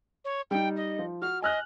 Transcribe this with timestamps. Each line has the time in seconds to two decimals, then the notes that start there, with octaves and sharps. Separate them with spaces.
0.25 C#5
0.51 G3 D#4 G5
0.76 D#5
0.99 F3
1.22 F#4 F6
1.42 D#5 G#5 F6 F#6